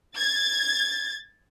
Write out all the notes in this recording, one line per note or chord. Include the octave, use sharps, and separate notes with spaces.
G#6 A6